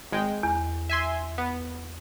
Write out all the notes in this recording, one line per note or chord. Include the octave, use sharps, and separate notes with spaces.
G#1 G#3 G5
E2
E5 G#5 C6
B3